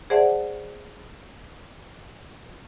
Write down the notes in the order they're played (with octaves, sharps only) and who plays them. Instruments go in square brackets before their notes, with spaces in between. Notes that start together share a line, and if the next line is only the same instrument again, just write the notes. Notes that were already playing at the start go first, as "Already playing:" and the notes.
[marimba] G#4 C5 D5 E5 F#5 A5